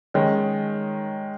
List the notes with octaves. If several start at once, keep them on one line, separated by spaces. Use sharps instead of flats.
D#3 G#3 C#4